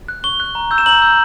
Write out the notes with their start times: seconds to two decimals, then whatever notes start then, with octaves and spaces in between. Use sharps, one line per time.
0.08 F#6
0.24 C#6 G7
0.40 F#6
0.55 A#5
0.71 E6 G6
0.78 E7
0.86 A#5 F#7
1.02 E6 G6